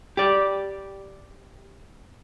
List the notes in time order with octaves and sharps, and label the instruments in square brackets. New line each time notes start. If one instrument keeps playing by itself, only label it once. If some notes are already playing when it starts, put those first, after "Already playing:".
[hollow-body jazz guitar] G4 D5